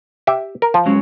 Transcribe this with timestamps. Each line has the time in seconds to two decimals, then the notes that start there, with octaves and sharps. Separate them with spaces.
0.27 G4 E5
0.62 A#4
0.74 F3
0.86 F#3 G#3 C#4